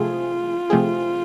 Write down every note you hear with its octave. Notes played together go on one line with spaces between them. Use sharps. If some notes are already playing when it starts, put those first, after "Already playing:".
Already playing: C3 F3 A3 C4 F4 G#4
C3 F3 A3 C4 G#4